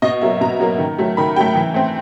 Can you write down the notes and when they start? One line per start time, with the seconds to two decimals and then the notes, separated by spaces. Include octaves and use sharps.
0.02 B2 D#5
0.22 F#3 A#3 E5
0.41 B2 A#5
0.60 F#3 A#3
0.79 D#3
0.98 F#3 A3
1.17 D#3 B5
1.36 F#3 A3 G5
1.55 E3
1.74 A3 C4